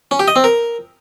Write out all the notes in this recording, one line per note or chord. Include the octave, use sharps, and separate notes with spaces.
C#4
G4
D#5
C4
A#4